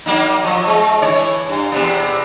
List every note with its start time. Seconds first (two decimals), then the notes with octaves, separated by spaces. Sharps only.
0.06 F#3 A#3 D#4
0.44 F3 D#5
0.68 G#3
1.02 E3 C#5
1.48 G2
1.72 E2 C3 B3